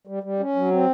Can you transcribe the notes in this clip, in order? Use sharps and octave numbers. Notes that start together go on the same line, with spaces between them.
G3
G3
C#4
F#3
C4